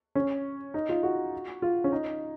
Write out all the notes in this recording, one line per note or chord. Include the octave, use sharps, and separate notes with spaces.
C#4
D#4
F4
F#4
F4
C#4
D#4